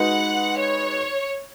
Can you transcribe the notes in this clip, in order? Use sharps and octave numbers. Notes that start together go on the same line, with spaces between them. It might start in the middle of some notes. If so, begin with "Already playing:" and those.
Already playing: G#3 D#4 F#4 B4 F#5
C#5